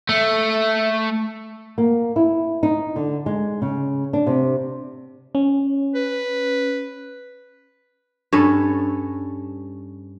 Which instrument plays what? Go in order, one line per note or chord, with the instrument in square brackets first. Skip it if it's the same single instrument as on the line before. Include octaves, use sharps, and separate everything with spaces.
[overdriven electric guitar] A3
[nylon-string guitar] A#3
E4
D#4
D3
G#3
C#3
D4
C3
[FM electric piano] C#4
[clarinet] B4
[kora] G2 C#4 A4 B4